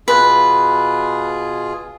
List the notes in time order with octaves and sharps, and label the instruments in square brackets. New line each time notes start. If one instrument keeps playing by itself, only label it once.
[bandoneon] B2 F4 G#4 [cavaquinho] B4